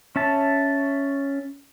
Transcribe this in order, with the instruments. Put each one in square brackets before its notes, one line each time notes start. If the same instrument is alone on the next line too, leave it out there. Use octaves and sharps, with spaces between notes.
[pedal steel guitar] C#4 E5 A5